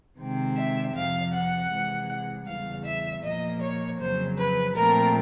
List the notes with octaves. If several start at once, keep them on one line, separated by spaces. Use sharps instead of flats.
C3 D#3 G#3 C4
E5
F2 C3 F3 F5
F#5
C3 E3 G#3
E2 C#3 E3 G3 F5
E5
A#2 F3 A#3 D#5
C#5
F2 C#3 F#3 C5
B4
A#2 F3 A3 C4 A#4